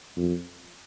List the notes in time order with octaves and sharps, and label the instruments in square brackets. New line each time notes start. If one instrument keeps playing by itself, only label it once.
[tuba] F2